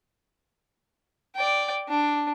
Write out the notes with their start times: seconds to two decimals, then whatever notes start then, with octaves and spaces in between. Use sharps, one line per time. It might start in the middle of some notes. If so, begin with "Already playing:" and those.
1.36 D5 G5
1.89 D4